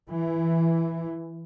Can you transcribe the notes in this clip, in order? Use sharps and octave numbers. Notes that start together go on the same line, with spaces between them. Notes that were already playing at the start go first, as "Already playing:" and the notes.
E3